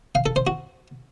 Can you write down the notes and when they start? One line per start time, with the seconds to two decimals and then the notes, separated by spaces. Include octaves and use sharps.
0.15 F5
0.26 A4
0.36 C5
0.47 F#4